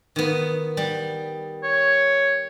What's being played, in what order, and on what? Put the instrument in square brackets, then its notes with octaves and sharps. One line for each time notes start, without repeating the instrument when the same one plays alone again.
[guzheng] D#3 B3
G3
[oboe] C#5